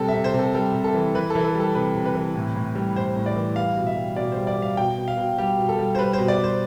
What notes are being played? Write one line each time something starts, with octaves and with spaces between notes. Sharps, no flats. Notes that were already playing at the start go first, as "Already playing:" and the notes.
Already playing: C3 G3 A4
E5
C3
C5
C3 A4
G3 A4
C3
A4
E3
E3 B4
E3 A4
A4
G3
A4
C3 B4
C3
B4
E3
A2
A2
G3
A2 C5
A2
D5
E3
G3 F5
B2
E5
G3
B2 D5
G3 C5
D5
G3 F5
B2 G5
B2
F5
B2
G3 G4
B2
A4
G3
C5
G3 B4
C5
B2
D5
G3
C5